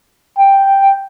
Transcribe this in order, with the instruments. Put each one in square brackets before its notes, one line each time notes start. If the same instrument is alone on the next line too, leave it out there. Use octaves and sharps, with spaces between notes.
[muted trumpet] G5